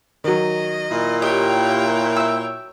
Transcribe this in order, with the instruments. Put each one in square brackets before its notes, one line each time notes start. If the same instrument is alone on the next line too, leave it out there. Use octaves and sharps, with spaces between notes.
[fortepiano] D#3 F#3 [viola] D#5
[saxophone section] A#2 E4
[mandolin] G4 D#5 [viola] C#5 G5
[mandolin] E5 E6